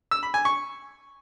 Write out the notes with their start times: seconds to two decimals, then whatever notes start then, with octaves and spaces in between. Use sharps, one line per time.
0.11 E6
0.23 B5
0.34 G#5
0.45 C#6